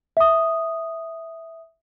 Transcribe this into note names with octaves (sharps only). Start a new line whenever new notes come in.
E5 D#6